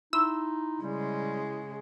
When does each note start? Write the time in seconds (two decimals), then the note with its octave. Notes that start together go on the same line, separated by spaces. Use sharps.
0.13 D#4 E4 C6 E6
0.83 C#3 G3 G#3